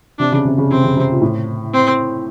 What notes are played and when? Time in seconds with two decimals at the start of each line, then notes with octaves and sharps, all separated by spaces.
0.19 C3 D4
0.32 C#3
0.45 C3
0.58 C#3
0.71 C3 C4
0.84 C#3
0.97 C3
1.11 A#2
1.21 A2
1.73 C4